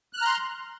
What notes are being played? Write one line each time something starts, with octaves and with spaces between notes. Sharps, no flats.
A#5 C6 F6 F#6